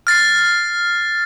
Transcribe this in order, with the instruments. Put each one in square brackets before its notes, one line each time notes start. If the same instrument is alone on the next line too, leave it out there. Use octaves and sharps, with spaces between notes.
[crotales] F6 A6 C7